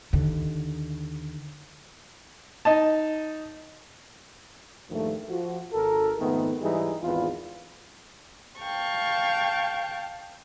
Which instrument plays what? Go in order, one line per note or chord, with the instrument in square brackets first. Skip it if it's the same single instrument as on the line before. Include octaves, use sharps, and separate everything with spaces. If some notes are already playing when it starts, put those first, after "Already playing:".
[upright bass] D#2 D3
[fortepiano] D#4 D#5 A5
[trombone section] A#1 G2 D#3 F3 A3
F3 F#4
G#1 A4 A#4
F2 G#2 D#3 A3 B3
G#2 E3 G3 G#3 D#4 G#4
G#1 E2 F4 B4
[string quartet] F5 G5 A5 C#6